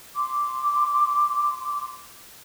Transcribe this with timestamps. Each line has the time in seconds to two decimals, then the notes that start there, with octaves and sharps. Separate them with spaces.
0.16 C6 D6